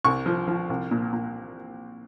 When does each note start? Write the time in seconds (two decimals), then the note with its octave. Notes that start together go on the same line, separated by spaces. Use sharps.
0.04 C2 C#6
0.26 F3
0.48 F3
0.70 C2
0.91 A#2
1.13 A#2